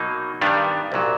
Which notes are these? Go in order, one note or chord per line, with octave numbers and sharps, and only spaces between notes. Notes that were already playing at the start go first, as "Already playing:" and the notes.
Already playing: B2 F#3 A#3 D#4
G2 D#3 G3 B3 D4
C2 A#2 F#3